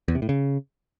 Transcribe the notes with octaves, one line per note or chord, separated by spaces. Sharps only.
E2
C3
A2
C#3